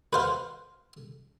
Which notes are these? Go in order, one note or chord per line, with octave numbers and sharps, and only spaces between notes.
B4 C5 F5